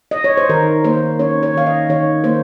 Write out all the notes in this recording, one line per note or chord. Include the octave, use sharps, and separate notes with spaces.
D#5
C#5
C5
D#3 A#4
A#3 C5
C#4 C#5
C#5
D#3 F5
D#5
D#3 C#5
A#3 C5